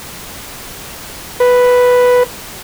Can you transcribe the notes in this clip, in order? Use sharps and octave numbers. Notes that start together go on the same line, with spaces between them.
B4